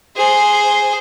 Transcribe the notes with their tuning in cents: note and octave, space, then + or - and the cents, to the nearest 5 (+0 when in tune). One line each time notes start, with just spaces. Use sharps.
G#4 +0 C5 +0